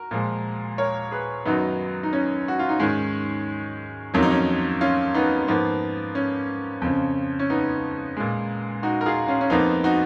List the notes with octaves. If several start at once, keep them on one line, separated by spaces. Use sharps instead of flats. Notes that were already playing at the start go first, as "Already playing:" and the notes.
Already playing: F#4 A#4
A#2 F3 G#3
A#4 C#5
G#4 B4
F#2 D#3 F#3 B3 D#4
D#4
C#4
F#4
F4
D#4
G#2 D#3 G#3 C#4
F2 D#3 F#3 A#3 C#4
D#4
C#4
C#4 F4
B3 D#4
G#2 F3 A#3 B3
C#4
F2 C#3 F3
C#4
B3 D#4
A#2 G#3
D#4 F#4
A#4
F4 G#4
C#4 F4
C#4
F2 F3 A#3 B3 D#4
D#4 F#4